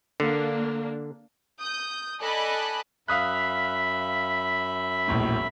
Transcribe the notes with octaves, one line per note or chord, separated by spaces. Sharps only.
D3 A#3 D4
D#6 G6
A4 D5 D#5 G#5 B5 F#6
F#2 E5 F5 B5 D#6 F#6
E1 A#1 A2